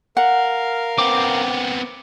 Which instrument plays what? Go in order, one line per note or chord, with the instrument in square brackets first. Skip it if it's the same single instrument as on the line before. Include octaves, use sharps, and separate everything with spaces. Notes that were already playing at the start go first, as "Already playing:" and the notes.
[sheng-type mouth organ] A#4 F5 [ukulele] F#5
[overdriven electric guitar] B3 C4 [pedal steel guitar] D6